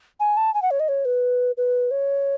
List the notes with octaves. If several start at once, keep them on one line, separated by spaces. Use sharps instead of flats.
G#5
A5
G#5
F#5
C#5
D#5
C#5
B4
B4
C#5